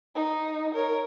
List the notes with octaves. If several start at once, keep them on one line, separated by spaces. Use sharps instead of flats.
D#4
A#4 C#5